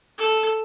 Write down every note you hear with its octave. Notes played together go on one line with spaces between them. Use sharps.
A4